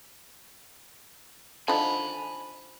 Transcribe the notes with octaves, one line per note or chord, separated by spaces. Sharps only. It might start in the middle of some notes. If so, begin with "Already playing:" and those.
D3 F3 D#4 G#5 B5